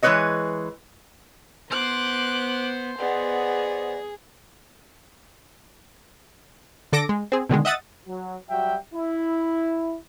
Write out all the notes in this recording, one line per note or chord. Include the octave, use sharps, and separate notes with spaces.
E3 G#3 C4 B4 C#5 D#5
B3 C5 D6 F#6
B3 G#4 D5 D#5 F#5
D3 A4 D6 A#6 D7
G#3
C4 G#4
B2 D3 D#3 G#3
D#5 E5 F#5 D#6 A6
F#3
F#3 G3 F#4 E5 G5
E4